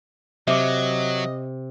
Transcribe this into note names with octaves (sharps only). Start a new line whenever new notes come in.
C3 F#3 D#5 E5 D6